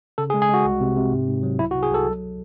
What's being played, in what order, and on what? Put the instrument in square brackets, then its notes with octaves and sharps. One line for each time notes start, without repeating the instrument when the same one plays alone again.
[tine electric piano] C#3 A4
G#4
G#3
G#4
G#3 F#4
C2
C3
C3
G#2
G#2
F#3
C2 E4
F#4
C3
G#4
C2 A4
F#3